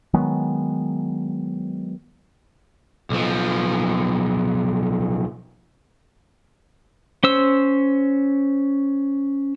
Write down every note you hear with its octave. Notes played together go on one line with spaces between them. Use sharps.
D#3 F#3 G#3 B3
B1 F3
C#4 C5 E6